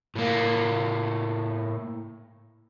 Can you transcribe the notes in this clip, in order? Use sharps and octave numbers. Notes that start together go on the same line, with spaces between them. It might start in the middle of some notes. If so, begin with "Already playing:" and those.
A2 A#3